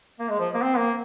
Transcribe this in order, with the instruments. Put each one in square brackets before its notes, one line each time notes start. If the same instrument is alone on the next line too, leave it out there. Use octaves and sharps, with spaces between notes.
[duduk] A#3
G#3
F3
A#3
C4
A#3